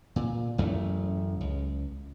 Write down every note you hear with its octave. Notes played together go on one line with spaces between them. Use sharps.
A#2
A1 F#2 A3
C#2